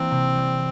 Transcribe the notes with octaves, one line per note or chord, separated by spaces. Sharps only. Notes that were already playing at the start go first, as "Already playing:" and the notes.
Already playing: E3 G3 A#3 C4
C3
G3